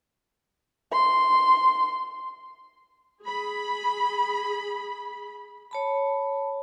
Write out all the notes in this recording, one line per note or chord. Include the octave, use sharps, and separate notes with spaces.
C6
G#4 B5
C#5 A5 B5